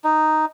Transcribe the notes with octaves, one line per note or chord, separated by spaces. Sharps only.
D#4